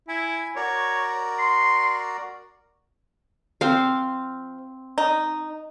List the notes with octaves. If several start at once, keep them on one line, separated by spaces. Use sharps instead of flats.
E4 G#5
F#4 A#4 C#5 D5
C6
F3 C4 C5 F5
D#4